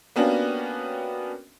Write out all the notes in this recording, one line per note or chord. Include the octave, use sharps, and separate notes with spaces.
A#3 B3 C#4 D4 F#4 G4